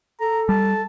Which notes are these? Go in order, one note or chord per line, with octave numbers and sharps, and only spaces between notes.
A4 A#5
G3 A5